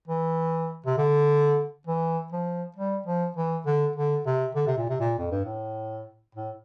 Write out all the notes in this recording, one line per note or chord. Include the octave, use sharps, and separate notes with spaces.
E3
C3
D3
E3
F3
G3
F3
E3
D3
D3
C3
D3
C3
A#2
C3
A#2
F2
G2
A2
A2